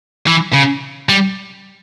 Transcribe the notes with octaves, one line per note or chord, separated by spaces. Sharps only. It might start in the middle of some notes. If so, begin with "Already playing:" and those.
E3
C#3
G3